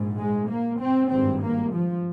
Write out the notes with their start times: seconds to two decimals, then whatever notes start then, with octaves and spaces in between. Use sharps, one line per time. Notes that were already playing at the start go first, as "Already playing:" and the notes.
Already playing: A#1 G#2
0.18 G#3
0.50 A#3
0.80 C4
1.11 G#1 G2 C4
1.42 A#3
1.73 F3